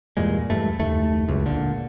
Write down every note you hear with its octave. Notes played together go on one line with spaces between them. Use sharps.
E2 G2 A#2 G#3
E2 G2 A3
F#1 D#2 A3
F#1 C#2 F#2
A#2 D3